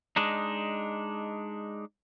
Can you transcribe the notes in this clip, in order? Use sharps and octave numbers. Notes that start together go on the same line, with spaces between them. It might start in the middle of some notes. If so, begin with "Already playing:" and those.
G#3 D4 D#4